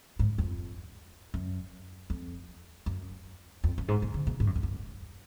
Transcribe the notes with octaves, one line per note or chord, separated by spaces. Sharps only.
G#2
F2
F#2
F2
F#2
F2
F#2
G#2
B2
D3
B2
G#2
F#2
F2
F#2